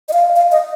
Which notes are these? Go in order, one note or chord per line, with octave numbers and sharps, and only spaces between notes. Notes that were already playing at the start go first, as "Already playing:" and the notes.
D#5
F5
F5
D#5